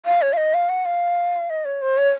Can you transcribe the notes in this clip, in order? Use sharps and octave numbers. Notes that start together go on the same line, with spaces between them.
F5
C#5
F5
D#5
F5
F#5
F5
D#5
C#5
C5
C#5